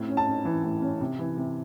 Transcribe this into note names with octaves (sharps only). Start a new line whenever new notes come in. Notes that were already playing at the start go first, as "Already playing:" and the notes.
Already playing: A2 C4
C#4
A5
C#4
E3
A2
C#4
C3
E3
C3